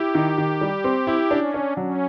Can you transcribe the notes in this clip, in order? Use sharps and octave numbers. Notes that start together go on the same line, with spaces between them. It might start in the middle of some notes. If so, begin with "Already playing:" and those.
Already playing: E4 G4
D#3
D#3
G3
C4
E4
C#4 D4
D4
F#3 C#4